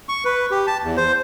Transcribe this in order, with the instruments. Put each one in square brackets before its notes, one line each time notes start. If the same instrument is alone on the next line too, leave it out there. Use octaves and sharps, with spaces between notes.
[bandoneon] C#6
B4
G4
A5
E2
C5